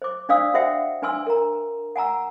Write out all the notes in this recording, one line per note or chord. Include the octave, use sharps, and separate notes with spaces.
C5 D6
D4 C5 D5 F5 D#6 E6
F#4 C5 E5 F#5 G5
D4 B4 G#5 C6 E6
A#4 A#5
F#5 G#5 A#5 E6